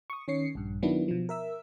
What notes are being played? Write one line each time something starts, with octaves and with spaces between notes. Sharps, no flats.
C#6 D#6
D#3 C#4 C#5 C7 C#7
A#1 G2
D#3 F#3 B3 D4 E4
B2 F3
A#4 E5 E6